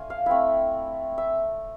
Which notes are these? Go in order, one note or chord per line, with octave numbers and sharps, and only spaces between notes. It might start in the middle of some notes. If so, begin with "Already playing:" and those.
Already playing: A3 D4 F4 G#5
F5
A3 C4 E4 E5
E5